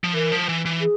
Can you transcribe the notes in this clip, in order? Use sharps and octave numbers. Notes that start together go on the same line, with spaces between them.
F3
E3 A#4
F3
E3
E3
G#4